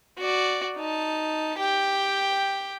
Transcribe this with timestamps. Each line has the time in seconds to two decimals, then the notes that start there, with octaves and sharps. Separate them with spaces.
0.18 F#4 D5
0.77 D#4 A5
1.58 G4 G5